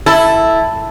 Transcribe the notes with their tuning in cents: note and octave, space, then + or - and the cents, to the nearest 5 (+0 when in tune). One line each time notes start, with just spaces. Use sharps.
E4 +0 A4 +0